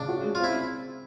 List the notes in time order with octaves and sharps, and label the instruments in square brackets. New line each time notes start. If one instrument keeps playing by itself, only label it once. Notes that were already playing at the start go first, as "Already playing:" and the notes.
Already playing: [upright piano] C#3 [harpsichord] D4
[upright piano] F#4
G#3
[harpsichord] F4
[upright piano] C4 [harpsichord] E4